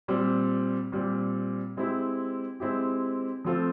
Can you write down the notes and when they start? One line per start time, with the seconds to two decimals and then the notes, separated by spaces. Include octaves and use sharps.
0.08 A#2 G3 C4
0.92 A#2 G3 C4
1.77 G#3 C4 E4 G4
2.60 G#3 C4 E4 G4
3.45 F3 A3 C4 F4 A4